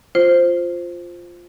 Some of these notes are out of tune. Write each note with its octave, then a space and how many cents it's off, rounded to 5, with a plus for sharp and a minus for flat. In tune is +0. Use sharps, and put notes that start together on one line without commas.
F4 +0 C5 +0